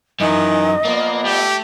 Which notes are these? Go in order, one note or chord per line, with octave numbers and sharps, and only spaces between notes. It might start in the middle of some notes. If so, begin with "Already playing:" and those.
F#2 D#3 E3 D#5
F3 A#3 B3 D5
A3 G4